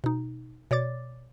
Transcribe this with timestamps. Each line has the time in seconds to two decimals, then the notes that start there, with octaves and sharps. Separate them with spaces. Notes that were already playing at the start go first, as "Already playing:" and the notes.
0.04 B2 D#4
0.71 B2 C#5 D5 D6 A6